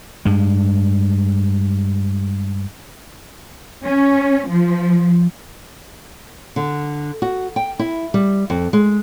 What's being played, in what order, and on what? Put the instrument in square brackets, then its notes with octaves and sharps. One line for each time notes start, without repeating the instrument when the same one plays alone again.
[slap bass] G2 G#3
[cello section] C#4
F3
[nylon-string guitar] D3
F#4
G5
E4
G3
F2
G#3